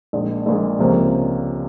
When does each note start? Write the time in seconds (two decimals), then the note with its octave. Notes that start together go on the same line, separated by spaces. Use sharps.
0.13 A#1 A#2 G#3
0.46 A#1 A#2 G#3
0.79 C#2 C3 F3 A#3 C#4